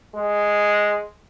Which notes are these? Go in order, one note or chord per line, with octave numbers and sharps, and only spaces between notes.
G#3